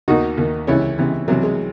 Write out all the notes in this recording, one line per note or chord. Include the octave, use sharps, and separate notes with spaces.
D#2 D#3 D#4 F#4
D#2 D#3
C#2 C3 E3 C#4 E4
C#2 C3 E3
C2 C3 E3 F#3
G#3